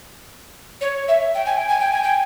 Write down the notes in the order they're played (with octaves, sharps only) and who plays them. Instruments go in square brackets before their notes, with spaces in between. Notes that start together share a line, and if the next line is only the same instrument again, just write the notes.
[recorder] C#5
E5
G5
G#5
G5
G#5
G5
G#5
G5